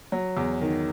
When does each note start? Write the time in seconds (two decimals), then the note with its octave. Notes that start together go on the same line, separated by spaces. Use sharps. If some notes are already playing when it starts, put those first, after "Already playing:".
0.12 F#3
0.37 E2
0.61 D#3